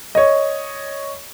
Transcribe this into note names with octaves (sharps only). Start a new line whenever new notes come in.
C#5 D#5